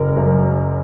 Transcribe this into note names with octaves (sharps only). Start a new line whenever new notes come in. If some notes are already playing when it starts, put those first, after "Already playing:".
Already playing: F#1 A#4
F#2